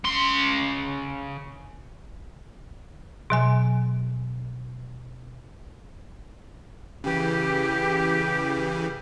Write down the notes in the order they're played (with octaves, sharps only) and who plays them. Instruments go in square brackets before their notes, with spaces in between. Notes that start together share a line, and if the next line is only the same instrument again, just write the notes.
[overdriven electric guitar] C#3 C6
[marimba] B2 F#3 G#5
[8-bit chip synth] C#3 E3 [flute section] G4